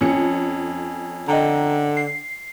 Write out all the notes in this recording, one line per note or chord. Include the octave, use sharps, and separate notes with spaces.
F2 C#4 C#7
D3 D#5 G5 A#5
C7